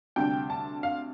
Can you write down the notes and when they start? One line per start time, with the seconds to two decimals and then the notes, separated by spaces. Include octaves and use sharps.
0.16 D2 C3 G3 D4 G5
0.50 A5
0.83 F5